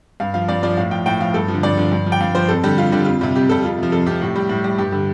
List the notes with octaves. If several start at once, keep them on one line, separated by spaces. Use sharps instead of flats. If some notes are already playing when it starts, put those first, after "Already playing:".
G2 F5
F3 F5
G2 D5
F3 D5
A2 F5
F3 G5
A2 G5
F3 F5
G2 A4
F3
D3
G2 D5
D3 F3
G2
F3
G5
G2 F5
F3 C5
F2 A4
D3 G3 G4
F2 F4
D3 G3
F2 F4
C3 G3
F2 G4
C3 G3 A4
F2 F4
C3 F3
F2 A4
C3 F3 G4
A2
G3
A2
G3
G2 G4
D3 G3